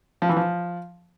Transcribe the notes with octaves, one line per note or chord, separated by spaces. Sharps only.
F3
E3
F3